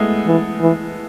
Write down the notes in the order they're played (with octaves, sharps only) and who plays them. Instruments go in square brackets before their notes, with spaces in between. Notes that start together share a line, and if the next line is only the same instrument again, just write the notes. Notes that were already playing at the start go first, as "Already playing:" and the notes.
Already playing: [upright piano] G#3 A3 B3
[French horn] E3
E3